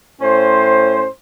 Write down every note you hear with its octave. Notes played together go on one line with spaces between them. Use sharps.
A2 C#4 C5